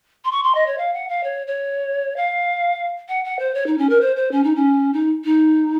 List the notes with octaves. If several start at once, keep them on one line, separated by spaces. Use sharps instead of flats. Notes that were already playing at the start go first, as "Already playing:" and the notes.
C6
C#6
C6
D#5
C#5
F5
F#5
F5
C#5
C#5
F5
F#5
F#5
C5
C#5
D#4
C#4
A#4
C5
C5
C#4
D#4
C#4
D#4
D#4